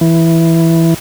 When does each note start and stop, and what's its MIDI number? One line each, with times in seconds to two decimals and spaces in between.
0.01 0.94 52